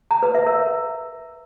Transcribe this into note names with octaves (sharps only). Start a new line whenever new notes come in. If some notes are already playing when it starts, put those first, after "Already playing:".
A#5
B4
E5
A#4